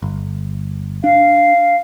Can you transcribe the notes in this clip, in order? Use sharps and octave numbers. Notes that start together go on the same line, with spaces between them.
G1
D4 F5